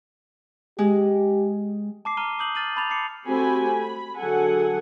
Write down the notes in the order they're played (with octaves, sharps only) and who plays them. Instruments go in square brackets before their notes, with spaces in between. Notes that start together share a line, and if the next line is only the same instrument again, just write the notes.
[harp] G#3 [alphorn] G4
[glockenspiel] A5 D6 C7
A5 A#5 F6 D#7 G7
D6 D#6 G6 F#7
F6 A6 D#7 F#7
A5 B5 D6 G6 A6 F7
A5 D6 C7 C#7
[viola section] A3 C4 F#4 G4 G#5 B5
B5
D3 F#3 G#4 A4 F#5 G#5